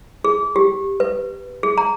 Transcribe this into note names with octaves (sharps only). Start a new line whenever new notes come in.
G#4
G4
B4
G#4
A#5